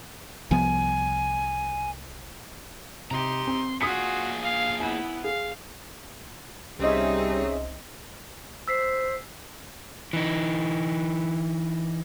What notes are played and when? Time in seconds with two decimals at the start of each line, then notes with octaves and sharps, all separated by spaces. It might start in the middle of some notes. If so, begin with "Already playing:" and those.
0.51 C2 F3 B3 G#5
3.11 C3 D#4 G4 A#5 C6
3.47 C4
3.81 A#2 F4 F#4 G#4 D#6 B6 C#7
4.43 F5
4.80 B3 E4 G#5
5.24 G#4 F5
6.80 C2 G3 C4 C#4 D#4 G#4 D#5 E5
8.68 C5 E6 B6 C7
10.13 E3 D#4